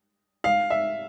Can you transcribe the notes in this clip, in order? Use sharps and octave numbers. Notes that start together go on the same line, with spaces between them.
F5
E5